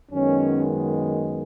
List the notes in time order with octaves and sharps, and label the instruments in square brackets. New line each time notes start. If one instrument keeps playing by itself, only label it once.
[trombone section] F#2 D#3 G#3 B3 C#4